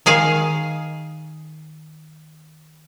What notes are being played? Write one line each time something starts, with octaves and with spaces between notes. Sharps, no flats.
D#3 G#4 F5 G#5